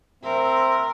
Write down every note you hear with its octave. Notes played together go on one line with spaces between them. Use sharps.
C4 A#4 E5